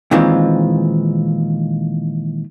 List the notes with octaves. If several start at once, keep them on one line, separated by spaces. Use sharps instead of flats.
A#2 D#3 E3 G#3 C4 F4